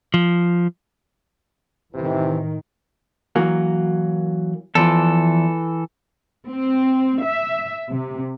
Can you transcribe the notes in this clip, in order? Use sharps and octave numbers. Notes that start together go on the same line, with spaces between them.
F3
A2 C3 D#3 E3
E3 F#3 A#3
E2 E3 F3 A4
C4
E5
C3